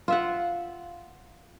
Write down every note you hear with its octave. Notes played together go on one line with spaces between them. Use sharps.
F4 E5 F#5